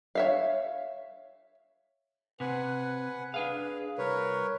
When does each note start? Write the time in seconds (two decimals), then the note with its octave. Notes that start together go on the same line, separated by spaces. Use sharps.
0.15 C#5 E5 F5
2.40 C3 B4 F#5 G#5
3.34 D4 G#4 B4 F5
3.98 C2 A#4 B4 C#5